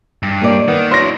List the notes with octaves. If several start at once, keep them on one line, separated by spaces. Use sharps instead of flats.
G2
D#2 A#3 D5
D#3 B3
F#3 D4 E4 C6 A#6